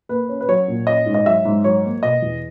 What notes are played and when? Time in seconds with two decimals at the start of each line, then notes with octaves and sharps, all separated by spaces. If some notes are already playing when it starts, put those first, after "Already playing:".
0.09 A#3 B4
0.29 C#4
0.41 B4
0.48 F#3 C#5
0.68 A#2
0.87 C#4 D#5
1.06 G#2
1.14 D#5
1.26 F#3 E5
1.45 G#2
1.64 F#3 C#5
1.84 A#3
2.03 B2 D#5
2.22 E2